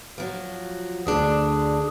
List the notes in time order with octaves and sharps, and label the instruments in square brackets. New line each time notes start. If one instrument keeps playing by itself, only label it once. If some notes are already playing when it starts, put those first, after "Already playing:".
[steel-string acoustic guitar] F3 F#3
[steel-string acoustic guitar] D2 D4 [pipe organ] G#4